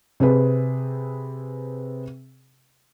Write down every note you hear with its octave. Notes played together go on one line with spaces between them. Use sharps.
C3 C4 G#4 B4